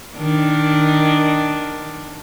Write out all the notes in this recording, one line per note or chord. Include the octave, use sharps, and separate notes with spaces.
D#3 D4